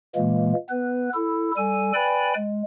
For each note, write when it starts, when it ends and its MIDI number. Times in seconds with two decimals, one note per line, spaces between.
0.16 0.53 46
0.16 0.53 52
0.16 0.53 56
0.16 0.53 58
0.69 1.09 59
0.69 1.09 71
1.14 1.51 64
1.14 1.51 69
1.57 1.92 55
1.57 1.92 69
1.57 1.92 80
1.94 2.34 71
1.94 2.34 74
1.94 2.34 79
1.94 2.34 80
1.94 2.34 83
2.36 2.63 56